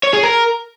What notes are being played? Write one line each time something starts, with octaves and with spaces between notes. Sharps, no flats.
C#5
G#4
A#4